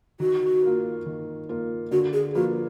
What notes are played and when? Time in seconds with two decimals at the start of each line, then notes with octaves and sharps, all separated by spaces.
0.20 D#3 F#4
0.63 A#3 F4 A#4
1.06 D#3
1.49 A#3 F4 A#4
1.91 D3 F#4
2.13 G#4
2.35 F3 A#3 F4 F#4 B4